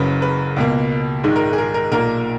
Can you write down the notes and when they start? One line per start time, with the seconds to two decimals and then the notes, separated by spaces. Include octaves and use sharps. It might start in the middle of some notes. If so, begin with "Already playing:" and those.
Already playing: F#1 F#2 C#3 B4
0.22 B4
0.56 C#2 B2 A#3
1.24 A#1 G#2 D#3 G#3
1.36 A#4
1.53 G#4
1.58 A#4
1.74 A#4
1.92 B1 A#2 A#3 A#4